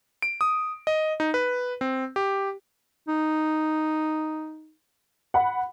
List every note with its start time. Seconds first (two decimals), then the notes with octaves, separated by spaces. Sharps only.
0.22 D7
0.41 D#6
0.87 D#5
1.20 D#4
1.34 B4
1.81 C4
2.16 G4
3.08 D#4
5.34 F#5 B5